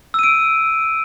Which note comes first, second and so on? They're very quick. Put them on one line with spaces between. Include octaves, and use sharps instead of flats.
E6 D#7 D7